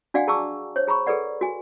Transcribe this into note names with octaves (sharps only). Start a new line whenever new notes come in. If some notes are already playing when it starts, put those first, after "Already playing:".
D4 F#4 D5 F5 F#5 G#5
G#4 A5 A#5 C#6 D6 E6
C5 C#5
G#4 A#5 B5 C#6
G#4 A4 B4 D5 F#5
F#4 G#5